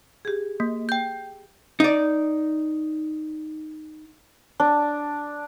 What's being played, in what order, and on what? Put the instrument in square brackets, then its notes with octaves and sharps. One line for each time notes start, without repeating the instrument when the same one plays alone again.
[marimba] G4 G#4
[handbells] A#3
G5 G6
[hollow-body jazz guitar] D#4 D5
[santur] D4